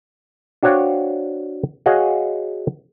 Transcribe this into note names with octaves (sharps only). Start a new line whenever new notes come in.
D4 F#4 C5 C#5 F5 G5
F#4 G#4 C#5 D#5 F5 F#5